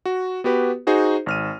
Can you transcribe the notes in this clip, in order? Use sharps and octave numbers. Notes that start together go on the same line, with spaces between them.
F#4
B3 F#4 G4 B4
D#4 F#4 G#4 C5
G#1 F6 D#7